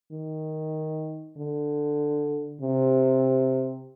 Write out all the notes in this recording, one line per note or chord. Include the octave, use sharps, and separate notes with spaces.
D#3
D3
C3